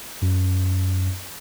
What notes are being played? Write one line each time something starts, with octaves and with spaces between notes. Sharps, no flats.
F#2